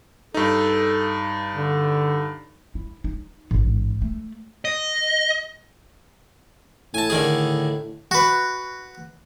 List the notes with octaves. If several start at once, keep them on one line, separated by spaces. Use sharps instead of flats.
G2 D#4 A4
D3
E4
D#4
A1 G#2
A3
D#5
A2 G#5 A5
D3 D#3 G#4
F#4 B4